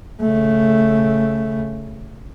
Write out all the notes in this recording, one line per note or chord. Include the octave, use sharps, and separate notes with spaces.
C#3 A3